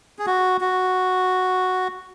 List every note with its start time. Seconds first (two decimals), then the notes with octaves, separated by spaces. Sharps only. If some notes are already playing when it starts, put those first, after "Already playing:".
0.19 G#4
0.27 F#4
0.61 F#4